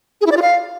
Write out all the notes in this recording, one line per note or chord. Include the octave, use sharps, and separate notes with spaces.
G#4
E4
D5
F4
F5